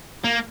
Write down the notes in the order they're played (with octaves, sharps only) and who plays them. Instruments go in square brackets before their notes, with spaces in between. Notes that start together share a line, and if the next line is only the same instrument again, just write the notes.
[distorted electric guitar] A#3